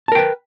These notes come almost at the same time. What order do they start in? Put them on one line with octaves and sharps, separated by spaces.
A5 A#4 G5 B4